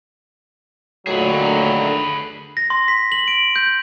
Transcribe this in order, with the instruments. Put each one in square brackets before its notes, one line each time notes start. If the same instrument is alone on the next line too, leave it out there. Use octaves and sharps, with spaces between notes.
[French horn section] A#2 D#3 F#3 [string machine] D3 [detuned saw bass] A3 [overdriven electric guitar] G#4 B4
[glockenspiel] A#6
C6
B6
F#7
D7
G6